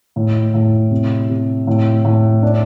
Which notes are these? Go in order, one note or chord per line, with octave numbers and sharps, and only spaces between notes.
A2
A2
C3
C3
A2
A2
D4